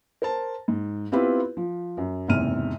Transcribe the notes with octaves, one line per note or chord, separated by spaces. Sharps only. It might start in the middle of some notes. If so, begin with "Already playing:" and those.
A#4 C5 A5
G#2
B3 C4 E4 F4 G4 B4
F3
F#2
F#1 E2 G#2 C3 F6 D#7